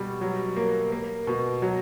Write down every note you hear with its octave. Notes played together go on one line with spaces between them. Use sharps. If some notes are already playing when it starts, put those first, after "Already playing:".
Already playing: B2 G3
F#3
A#3
A#3
B2
F#3